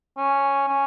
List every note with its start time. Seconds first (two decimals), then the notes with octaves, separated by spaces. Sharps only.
0.17 C#4
0.69 C#4